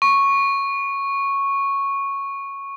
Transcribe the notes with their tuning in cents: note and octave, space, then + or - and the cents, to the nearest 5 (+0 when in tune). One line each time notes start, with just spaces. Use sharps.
C#6 -5